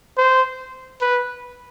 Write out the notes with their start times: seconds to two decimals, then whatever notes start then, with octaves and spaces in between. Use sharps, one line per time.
0.18 C5
1.01 B4